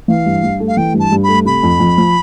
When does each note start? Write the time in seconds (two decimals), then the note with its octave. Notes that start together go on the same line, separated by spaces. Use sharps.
0.08 E3 F5
0.26 G2
0.43 G2
0.60 A3
0.68 F5
0.77 E3 G5
0.94 G2
1.00 A5
1.12 G2
1.23 A3 B5
1.45 C3 B5
1.63 F2
1.80 F2
1.98 F3